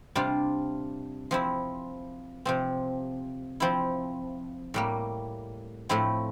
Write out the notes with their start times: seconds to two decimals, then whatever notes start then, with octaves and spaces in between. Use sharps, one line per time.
0.15 C3 G3 D4 F4
1.31 F3 C4 E4
2.45 C3 F3 C4
3.60 F3 C4 E4
4.74 A2 G3 A#3
5.89 A2 F3 A3 C4 E4